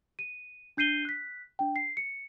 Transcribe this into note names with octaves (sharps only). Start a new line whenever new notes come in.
D#7
D4 G6 C7 D#7 G7
F#6 B6
D4 G5
C7
C#7